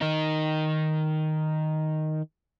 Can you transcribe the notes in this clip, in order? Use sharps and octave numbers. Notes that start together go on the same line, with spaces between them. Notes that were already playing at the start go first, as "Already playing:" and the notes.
D#3 D#4